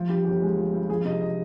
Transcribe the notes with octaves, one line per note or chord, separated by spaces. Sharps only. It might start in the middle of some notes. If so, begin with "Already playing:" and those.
Already playing: F3
G2 G4
G1 G4
G#3
F3
G2
F3 G#4
C3 D#5
D#5